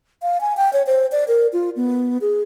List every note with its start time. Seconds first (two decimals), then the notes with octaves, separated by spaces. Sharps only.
0.22 F5
0.41 G#5
0.57 G5
0.73 C#5
0.87 C5
1.12 D5
1.28 A#4
1.53 F4
1.76 B3
2.21 G#4